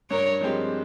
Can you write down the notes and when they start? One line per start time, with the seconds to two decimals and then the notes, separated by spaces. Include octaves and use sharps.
0.10 G2 A#4 C#5
0.41 F3 G#3 C4 G4